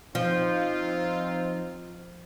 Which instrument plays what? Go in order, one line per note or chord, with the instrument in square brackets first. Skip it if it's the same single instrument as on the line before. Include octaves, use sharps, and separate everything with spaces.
[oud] F3 [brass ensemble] C4 D#4 F4